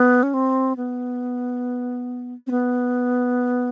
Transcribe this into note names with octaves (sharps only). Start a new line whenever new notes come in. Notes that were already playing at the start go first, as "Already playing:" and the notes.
Already playing: B3
C#4
C4
B3
C4
B3